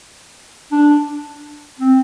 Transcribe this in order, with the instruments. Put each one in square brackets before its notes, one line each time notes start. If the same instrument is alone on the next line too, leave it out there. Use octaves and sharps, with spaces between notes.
[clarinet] D4
C4